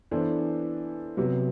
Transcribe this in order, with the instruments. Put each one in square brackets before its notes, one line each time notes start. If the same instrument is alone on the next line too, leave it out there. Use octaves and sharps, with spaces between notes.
[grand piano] E3 B3 D4 A4 C5
C3 F#3 B3